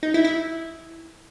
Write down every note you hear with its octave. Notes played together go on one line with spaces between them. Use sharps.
D#4
E4
E4